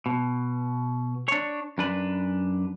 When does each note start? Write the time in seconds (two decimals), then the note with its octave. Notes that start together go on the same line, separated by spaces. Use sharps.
0.06 B2
1.28 D4 C#5
1.78 F#2 D4 B4